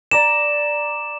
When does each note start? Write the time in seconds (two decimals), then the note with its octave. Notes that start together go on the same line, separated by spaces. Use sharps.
0.11 D5 A#5 D6 E7